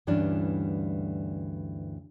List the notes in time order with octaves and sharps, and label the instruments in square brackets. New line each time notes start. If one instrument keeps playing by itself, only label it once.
[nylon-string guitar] D2 G2 E3 G3 C#4 D4